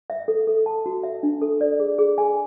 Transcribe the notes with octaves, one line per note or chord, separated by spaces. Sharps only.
E5
A4
A4
A5
F#4
E5
D4
A4
D5
G#4
G#4
G#5